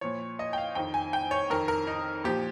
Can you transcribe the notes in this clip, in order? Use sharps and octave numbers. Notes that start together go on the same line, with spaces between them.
A#2 F3 C#5
D#5
G5
F5
F2 D#3 G5
G#5
G5
C#5
F2 D#3 A#4
A#4
D#4
A#2 F3 G4